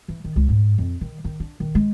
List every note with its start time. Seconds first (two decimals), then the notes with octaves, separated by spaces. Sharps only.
0.08 E3
0.24 D#3
0.36 C#2
0.48 G#2
0.78 F2
1.01 D#3
1.24 D#3
1.40 D4
1.60 D#3
1.75 G#3